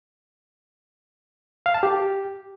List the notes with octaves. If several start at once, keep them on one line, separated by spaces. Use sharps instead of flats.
F5
A5
G4